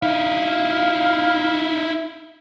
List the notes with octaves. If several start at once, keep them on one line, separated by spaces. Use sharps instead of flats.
D#4 E4 F5